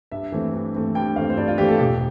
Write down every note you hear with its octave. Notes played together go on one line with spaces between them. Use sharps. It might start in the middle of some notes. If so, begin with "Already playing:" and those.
G2 E5
E3 A3 C4
G2
E3 A3 C4
G2 G5
E3 A3 C4 F5
C5
G2 D5
F4
E3 A3 C4 G4
A4
E1 G4